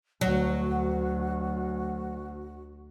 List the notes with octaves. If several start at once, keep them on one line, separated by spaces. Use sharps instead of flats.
D2 F#3 F#4